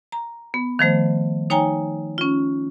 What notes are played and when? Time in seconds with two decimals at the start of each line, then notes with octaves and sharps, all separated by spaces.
0.12 A#5
0.54 B3
0.79 D#3 F3 A3 C5
1.50 D#4 C#5 G5 G#5 A#5
2.18 C#4 F4